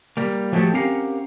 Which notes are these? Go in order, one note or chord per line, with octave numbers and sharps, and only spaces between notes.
G3 A#3
F3 F#3 G#3 A3 G4 A4
C4 C#4 G4 A#4 F5 F#5